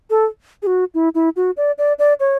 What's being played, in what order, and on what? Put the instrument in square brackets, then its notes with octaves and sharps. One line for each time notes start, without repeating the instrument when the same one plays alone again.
[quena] A4
G#4
F#4
E4
E4
F#4
D5
D5
D5
C#5